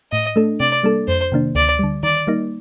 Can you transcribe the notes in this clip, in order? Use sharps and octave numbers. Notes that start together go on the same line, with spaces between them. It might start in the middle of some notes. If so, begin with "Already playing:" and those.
A2 D#5
A3 D4 A4
C3 D5
G3 A#3 D4 A4
F2 C5
C3 D#3 A#3 D4
D2 D5
D3 G3
D#3 D5
G3 A#3 D#4